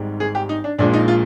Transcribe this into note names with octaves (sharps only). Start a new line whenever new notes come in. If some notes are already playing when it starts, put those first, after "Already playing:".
Already playing: G#1 G#2 G3
G#4
G4
D#4
D4
A#1 A#2 F3 G#3 D4
D#4
F4